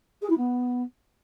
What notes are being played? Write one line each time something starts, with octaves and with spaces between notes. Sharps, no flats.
G#4
E4
B3